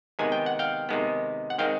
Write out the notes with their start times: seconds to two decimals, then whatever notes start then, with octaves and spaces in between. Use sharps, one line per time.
0.19 C3 D#3 G#3 B3 G#5
0.32 G5
0.46 F#5
0.59 F5 G5
0.89 C3 D#3 G#3 B3
1.50 F#5
1.59 D#3 G#3 C4 F5 G5